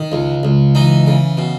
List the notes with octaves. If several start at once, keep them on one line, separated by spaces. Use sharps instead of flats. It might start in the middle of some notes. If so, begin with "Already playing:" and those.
Already playing: D#3
C#2
C#2
E3 D#4
C#3
B2